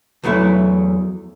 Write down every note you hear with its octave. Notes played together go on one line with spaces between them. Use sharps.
E2 F#3 A3 E4 B4